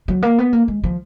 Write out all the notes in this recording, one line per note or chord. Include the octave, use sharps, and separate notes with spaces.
F#3
A#3
B3
A#3
G#3
F3